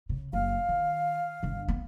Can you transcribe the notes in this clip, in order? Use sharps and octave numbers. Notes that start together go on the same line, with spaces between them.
C#3
F#1 F5
D#3
G1 D3
B3